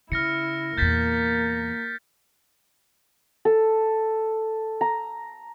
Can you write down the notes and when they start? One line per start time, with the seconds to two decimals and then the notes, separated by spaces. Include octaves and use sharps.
0.12 C#3 E4 F6 A#6 C#7
0.78 E2 A#2 A#3 G6 A6 B6
3.45 A4
4.81 A#5